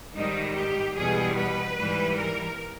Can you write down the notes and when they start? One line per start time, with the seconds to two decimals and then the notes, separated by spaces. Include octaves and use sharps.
0.15 G#2 D#3 G3 D#4
0.55 G4
0.95 E2 B2 G3 G#4
1.35 B4
1.76 G#2 E3 G3
2.17 A#4